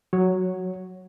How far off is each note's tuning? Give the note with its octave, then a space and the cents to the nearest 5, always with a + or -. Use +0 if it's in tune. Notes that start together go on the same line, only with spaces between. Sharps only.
F#3 +0 C#5 +0